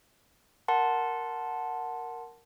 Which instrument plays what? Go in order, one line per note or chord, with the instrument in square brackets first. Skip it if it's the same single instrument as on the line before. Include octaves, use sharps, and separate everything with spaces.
[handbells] A#4 F#5 A5 C6